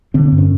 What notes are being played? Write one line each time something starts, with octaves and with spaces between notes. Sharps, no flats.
D3 C4
G2
C#4